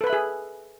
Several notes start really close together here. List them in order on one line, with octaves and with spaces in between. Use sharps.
A4 B4 B5 E5 G#4